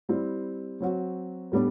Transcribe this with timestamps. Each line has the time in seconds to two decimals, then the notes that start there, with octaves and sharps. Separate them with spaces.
0.09 G3 C4 E4
0.80 F#3 C4 F#4
1.52 A2 G3 B3 D4